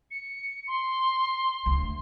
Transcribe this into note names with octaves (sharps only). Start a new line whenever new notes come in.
C#7
C6
D2